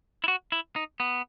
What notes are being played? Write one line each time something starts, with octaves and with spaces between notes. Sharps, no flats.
E4
F#4
E4
D#4
B3